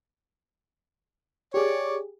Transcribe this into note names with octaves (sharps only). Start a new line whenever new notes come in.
G4 G#4 C#5 D5